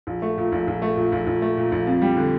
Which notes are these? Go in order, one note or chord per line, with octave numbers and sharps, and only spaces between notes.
A#1
A3
A#2
A#1
A#1
A3
A#2
A#1
A#1
A3
A#2
A#1
F2
G3
D3